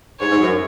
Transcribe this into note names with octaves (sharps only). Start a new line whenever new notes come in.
G#2 C#5
G#2
F#2